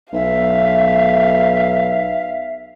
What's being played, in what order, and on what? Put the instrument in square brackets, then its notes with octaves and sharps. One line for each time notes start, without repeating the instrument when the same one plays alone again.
[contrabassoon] B1 [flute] E5 [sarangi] F5